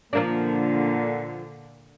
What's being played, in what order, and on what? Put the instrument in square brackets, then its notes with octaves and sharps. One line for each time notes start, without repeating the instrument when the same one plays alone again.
[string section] A#2 D3 [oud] F3 A#3 D4